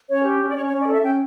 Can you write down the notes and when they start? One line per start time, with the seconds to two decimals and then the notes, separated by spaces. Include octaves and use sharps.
0.09 C#4 C#5
0.25 G4
0.41 C#4
0.49 D5
0.56 C#4 C#5
0.68 C#5
0.72 C#4
0.80 D5
0.87 A4 E5
1.03 C#4 G5